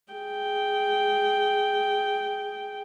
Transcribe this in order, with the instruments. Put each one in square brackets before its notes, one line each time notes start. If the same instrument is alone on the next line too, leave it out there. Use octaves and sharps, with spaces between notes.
[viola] G#4 G5